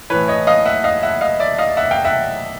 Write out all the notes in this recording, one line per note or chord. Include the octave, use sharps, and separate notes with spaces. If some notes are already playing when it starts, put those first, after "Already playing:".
A2 E3 B4 C#5
C#5 D#5
D#5 F5
E5 F#5
D#5 F5
E5 F#5
D#5 F5
D5 E5
D#5 F5
E5 F#5
F5 G5
E5 F#5